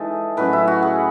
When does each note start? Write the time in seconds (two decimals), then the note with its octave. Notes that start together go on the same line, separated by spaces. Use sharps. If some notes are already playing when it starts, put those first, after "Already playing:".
Already playing: E3 G#3 D#4 A4
0.37 A2 F#3 C#4 B4
0.53 E4
0.68 F#4
0.82 G#4